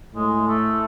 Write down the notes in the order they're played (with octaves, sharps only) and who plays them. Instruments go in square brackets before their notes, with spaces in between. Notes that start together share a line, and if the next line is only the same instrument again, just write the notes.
[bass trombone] A2 [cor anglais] G#3
[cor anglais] A3